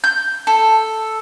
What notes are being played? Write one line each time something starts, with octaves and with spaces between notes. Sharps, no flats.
G6
A4